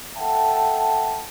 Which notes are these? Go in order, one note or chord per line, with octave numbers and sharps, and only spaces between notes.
A4 E5 F#5 G5 A5